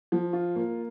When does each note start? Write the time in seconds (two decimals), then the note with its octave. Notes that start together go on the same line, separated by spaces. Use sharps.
0.12 F3
0.33 F4
0.56 A#3